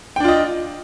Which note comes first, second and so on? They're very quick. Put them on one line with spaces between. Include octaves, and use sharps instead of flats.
G5 D4 F4 D#5